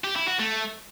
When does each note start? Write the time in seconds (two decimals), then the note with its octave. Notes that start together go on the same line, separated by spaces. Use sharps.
0.04 G4
0.16 E4
0.27 F#4
0.39 A3